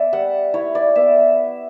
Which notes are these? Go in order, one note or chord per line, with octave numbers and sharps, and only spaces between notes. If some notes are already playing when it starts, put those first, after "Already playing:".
Already playing: B3 D5 E5
G3 F#5
E4 C#5
D5
B3 E5